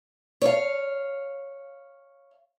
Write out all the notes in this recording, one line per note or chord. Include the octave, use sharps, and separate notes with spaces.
C#5 F5